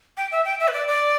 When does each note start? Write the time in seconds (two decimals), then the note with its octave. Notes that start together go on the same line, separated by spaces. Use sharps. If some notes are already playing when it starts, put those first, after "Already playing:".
0.17 G5
0.32 E5
0.45 G5
0.60 E5
0.68 B4
0.73 D5
0.88 D5